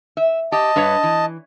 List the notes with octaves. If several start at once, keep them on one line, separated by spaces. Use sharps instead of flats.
E5
G4 D#5 A5
G2 B4 C#5
E3